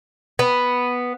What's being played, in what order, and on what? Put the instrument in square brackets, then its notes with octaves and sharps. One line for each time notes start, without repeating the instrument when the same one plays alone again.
[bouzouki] B3